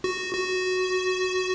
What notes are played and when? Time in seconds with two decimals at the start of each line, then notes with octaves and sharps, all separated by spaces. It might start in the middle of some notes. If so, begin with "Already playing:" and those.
0.04 F#4
0.35 F#4